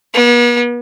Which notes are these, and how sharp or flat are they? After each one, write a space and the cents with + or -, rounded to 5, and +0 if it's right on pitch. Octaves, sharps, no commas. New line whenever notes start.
B3 -45